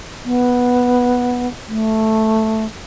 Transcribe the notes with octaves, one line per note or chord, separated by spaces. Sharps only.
B3
A3